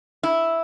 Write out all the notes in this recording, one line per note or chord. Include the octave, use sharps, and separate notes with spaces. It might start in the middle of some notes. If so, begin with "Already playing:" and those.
E4